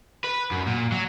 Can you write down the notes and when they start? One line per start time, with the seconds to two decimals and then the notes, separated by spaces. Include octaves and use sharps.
0.24 B4
0.51 F#2
0.67 A#2
0.92 F#3